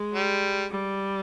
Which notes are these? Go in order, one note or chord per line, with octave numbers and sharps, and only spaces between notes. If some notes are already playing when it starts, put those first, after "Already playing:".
Already playing: G#3
G3
G3